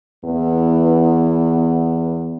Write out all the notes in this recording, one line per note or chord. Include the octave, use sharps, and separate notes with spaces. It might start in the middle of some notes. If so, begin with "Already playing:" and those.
E2 E3 B3